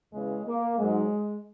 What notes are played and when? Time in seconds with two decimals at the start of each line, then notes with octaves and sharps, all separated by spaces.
0.12 E2 C#3 E3 G#3
0.45 A#3
0.77 G#2 F#3 G#3